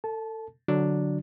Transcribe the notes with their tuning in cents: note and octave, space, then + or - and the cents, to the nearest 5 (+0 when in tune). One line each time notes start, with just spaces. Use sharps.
A4 +25 A5 -20
D3 +0 F#3 +0 D4 +0